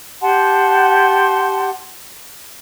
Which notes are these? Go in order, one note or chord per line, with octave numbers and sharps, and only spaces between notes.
G4 F#5 A5 C6